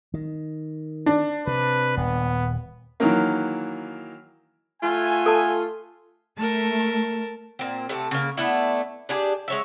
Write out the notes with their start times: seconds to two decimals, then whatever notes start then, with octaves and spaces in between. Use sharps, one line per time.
0.14 D#3
1.06 D4
1.47 C3 B4
1.97 D#1 B3
3.00 D#3 E3 F#3 A#3
4.83 A3 F4 E5 F#5 G#5
5.26 A4 A5
6.38 A3 A#4 A5
7.59 A#2 C4
7.89 C3 A3 A5
8.11 C#3 A#3
8.37 A3 B3 D4 E4
9.09 D4 G4 G#4
9.48 G#3 C#5 E5